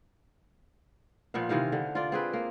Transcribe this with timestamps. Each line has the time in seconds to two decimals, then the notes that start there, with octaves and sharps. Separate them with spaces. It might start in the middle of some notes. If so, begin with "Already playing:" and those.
1.34 A#2 F3 B3 F5
1.49 C3 D#3 E3 F5
1.72 D3
1.95 F4 D5
2.12 C4 G#4 B4
2.33 A#3